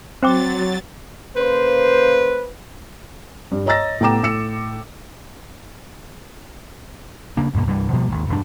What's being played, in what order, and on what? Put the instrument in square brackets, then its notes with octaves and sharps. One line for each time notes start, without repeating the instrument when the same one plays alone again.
[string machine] F#3 A6 [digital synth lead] C4 [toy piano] C5 G5 D6
[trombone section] C#3 A#3 C5 [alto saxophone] B4
[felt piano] G2
C#5 D#5 A#5 E6 A6 A#6
A2 B3 G5 A#5 D6 E7
A2 E6 C#7 E7
[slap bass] C#3 A#3 D4
D2 G2 B2 A#3
C2 G2 E3 G3
B2 F3 G3 A#3
G#1 D#2
E1 G2 D4